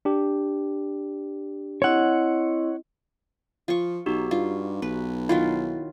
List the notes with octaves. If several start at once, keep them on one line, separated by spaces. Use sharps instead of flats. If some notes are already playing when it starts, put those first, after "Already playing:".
D4 G4
C4 E4 C#5 D#5 F#5
F3 F4 C#6
B1 D#4 F#4 G4
G2 F4
B1 B4
D#3 F#3 E4 F4